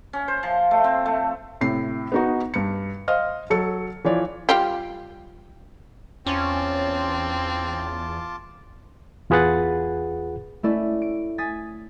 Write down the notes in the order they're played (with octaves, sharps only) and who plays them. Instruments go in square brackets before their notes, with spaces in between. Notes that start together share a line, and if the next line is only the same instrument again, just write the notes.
[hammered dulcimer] C#4
C5
F3
A3
C4
A3
[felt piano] A2 C3 C7
B3 D#4 F#4
G2 C#7
C5 D#5 F5 F6
F#3 A4 C#7
E3 F3 C#5 D5
[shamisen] G3 F4 G4
[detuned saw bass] E2 [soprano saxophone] C4 [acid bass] C#4 [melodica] F4 A5 D6
[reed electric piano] E2 F4 G#4 B4 F#5 A6
[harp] A3 C#4 E4 D5
D7
G#5 D#6 A6 B6